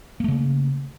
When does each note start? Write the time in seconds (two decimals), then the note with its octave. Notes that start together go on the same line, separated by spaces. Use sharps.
0.20 A#3
0.24 A3
0.28 C#3